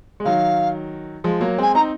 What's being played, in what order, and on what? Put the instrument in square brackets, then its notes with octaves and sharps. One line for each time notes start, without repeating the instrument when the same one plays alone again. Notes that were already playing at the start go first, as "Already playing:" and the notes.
[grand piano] G#3
[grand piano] D#3 F#3 [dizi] F5
[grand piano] F3 G#3
F#3 A#3
[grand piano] G#3 C4 [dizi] G#5
[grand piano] C4 D#4 [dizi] A#5